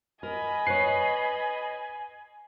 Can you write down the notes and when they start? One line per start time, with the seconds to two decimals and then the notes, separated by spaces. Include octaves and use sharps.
0.23 A#4 D#5 G#5 B5
0.67 B4 C#5 C7